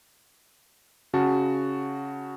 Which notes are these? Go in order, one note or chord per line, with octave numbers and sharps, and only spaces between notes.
C#3 F#4 A5